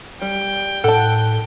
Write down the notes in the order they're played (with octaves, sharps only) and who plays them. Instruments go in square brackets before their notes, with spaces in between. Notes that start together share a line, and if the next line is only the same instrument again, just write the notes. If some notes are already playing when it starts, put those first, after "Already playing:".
[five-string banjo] G3 [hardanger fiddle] G5
[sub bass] A2 [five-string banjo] A4 A5 [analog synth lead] F#5